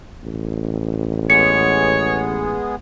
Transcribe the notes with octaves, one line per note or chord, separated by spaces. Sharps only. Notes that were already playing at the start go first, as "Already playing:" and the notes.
A1
G#3 B3 G#4 C#5 C#7